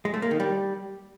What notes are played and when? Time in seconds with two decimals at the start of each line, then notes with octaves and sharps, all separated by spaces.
0.05 G#3
0.14 A3
0.22 A#3
0.31 D#3
0.40 G3